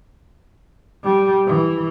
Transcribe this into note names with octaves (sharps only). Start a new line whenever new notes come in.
G3
E3